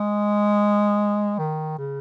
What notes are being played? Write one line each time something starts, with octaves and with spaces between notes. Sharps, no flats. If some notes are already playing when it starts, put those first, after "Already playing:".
Already playing: G#3
D#3
C#3